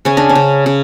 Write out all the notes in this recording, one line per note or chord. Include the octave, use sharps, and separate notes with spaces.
C#3 C#4
D4
C#4
C#3
C#3